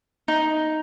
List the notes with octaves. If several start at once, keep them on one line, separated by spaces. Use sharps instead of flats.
D#4